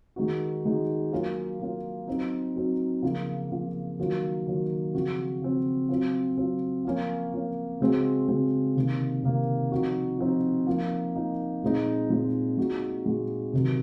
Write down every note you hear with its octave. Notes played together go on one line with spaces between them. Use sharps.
D#3 G#3 D#4 F#4
D#3 G#3 D#4 F#4
F#3 A#3 C#4 F4
F#3 A#3 C#4 F4
F#3 C4 D#4
F#3 C4 D#4
C#3 F3 A#3
C#3 F3 A#3
D#3 F#3 A#3 F4
D#3 F#3 A#3 F4
C#3 F3 C4 F#4
C#3 F3 C4 F#4
F#3 C4 F4
F#3 C4 F4
F3 A#3 C#4
F3 A#3 C#4
C#3 G#3 C4 F#4
C#3 G#3 C4 F#4
C3 D#3 A#3
C3 D#3 A#3
F3 C4 D#4 F#4
F3 C4 D#4 F#4
F3 A#3 D#4
F3 A#3 D#4
A#2 G#3 C4 D#4
A#2 G#3 C4 D#4
A#2 G#3 D#4 F#4
A#2 G#3 D#4 F#4
C3 D#3 F#3